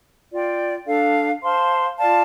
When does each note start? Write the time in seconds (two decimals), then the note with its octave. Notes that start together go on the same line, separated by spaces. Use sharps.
0.30 F4 D5 G5
0.86 D4 A4 F5
1.42 C5 F5 A5 C6
1.98 F4 D5 F5 A5